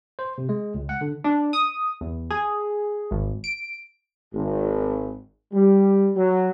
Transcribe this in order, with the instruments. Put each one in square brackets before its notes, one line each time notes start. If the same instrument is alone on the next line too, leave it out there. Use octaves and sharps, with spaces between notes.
[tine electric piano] C5
C3
G#3
C#2
F#5
D3
[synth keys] D4
D#6
E2
G#4
G#1
D7
[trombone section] G#1
G3
F#3